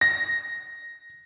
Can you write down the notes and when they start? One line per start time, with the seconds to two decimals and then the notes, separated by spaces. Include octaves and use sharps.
0.01 A#6